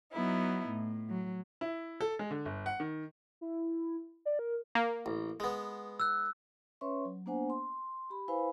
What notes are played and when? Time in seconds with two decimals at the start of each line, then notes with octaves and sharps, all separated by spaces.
0.14 F#3 B3 D#4 E4
0.69 A2
1.10 F#3
1.61 E4
2.01 A4
2.19 G#3
2.31 D3
2.45 G1
2.66 F#5
2.80 D#3
3.41 E4
4.25 D5
4.39 A#4
4.75 A#3
5.06 A1
5.40 G#3 B3
6.00 E6 F#6
6.81 C#4 B4 C#5 E5 C6 C#6
7.05 F#3
7.26 A#3 B3 D4 C5 F#5 G#5
7.50 C6
8.10 G4 B5
8.28 E4 B4 C5 F5 G#5 B5